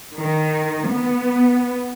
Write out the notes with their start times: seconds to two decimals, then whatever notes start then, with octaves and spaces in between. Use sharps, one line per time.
0.17 D#3
0.91 B3